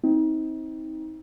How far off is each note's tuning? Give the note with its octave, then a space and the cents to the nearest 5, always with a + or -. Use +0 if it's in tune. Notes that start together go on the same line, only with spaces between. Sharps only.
C4 +0 D#4 +30